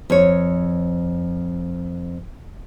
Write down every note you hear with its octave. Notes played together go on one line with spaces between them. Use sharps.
F2 C#5